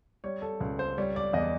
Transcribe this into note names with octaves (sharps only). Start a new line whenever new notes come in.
G3 C#5
A4
C#2
C5
G3 C#5
D5
E2 D#5